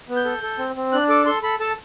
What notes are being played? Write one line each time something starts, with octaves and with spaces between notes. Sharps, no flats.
B3
G6
A4
A4
C4
C4
D4 F#6
A4 D6
A4 C6
A4 B5
A4 A5